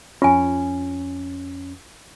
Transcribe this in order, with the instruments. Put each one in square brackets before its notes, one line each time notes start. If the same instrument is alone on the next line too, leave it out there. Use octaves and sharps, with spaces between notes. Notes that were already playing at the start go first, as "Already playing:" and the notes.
[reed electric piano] F2 C#4 [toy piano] F4 G#5